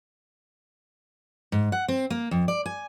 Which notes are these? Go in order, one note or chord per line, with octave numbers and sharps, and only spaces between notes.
G#2
F#5
C4
A#3
F2
D5
G#5